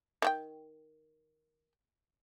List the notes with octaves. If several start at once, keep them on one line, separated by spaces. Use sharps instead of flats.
D#3 F#4 G5